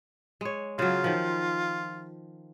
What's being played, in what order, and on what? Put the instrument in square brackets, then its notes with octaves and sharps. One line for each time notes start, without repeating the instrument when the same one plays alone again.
[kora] G#3 C#5
[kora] C#3 F#3 [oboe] F4
[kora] D#3 F3